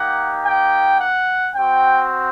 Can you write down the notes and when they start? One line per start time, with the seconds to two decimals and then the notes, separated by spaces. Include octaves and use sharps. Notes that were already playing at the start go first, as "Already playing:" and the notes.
Already playing: A#3 D#4 G4 F#5
0.46 G5
1.00 F#5
1.56 C4 F#4 G5